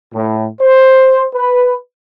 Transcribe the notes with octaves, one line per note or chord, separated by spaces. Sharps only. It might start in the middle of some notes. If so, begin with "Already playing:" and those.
A2
C5
B4